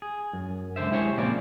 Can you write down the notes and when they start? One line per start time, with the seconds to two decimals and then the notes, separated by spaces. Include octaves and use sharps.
0.02 G#4
0.33 F#2
0.76 C#2 F#2 D3 C5 E5
0.91 G#3 E4 G4 C5 C#5
1.18 A#2 C#3 F3 A#3 C4 D5